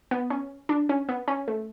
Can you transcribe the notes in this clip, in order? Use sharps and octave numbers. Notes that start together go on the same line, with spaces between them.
B3
C#4
D4
C#4
B3
C#4
A3